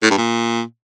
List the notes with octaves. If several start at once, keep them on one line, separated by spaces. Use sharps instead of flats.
A2
G2
A#2